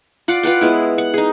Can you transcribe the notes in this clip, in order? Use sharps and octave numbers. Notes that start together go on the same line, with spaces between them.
F4 D5 F#5
F4 B4 F#5 G5
G#3 B3 E4
F#5
D#4 G#4